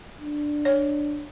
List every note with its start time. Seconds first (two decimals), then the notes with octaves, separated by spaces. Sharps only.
0.21 D4
0.65 C#5